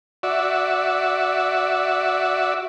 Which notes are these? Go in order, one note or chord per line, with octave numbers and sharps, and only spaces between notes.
F#4 D5 E5